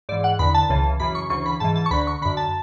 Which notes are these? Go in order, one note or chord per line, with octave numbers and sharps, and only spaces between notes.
G#2 E3 D5
F#5
E2 D3 B5
A5
C#2 C#3 E3
F#2 C#3 E3 B5
C#6
D2 C#3 E3 C#6
B5
G#2 E3 A5
A5
C#6
D2 D3 B5
C#6
F#2 D3 B5
A5